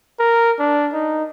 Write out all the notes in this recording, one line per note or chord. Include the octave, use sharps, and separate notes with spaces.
A#4
D4
D#4